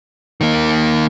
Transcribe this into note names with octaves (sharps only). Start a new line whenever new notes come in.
D#3 A#3